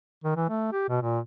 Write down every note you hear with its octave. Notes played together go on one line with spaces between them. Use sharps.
D#3
E3
A3
G4
B2
A#2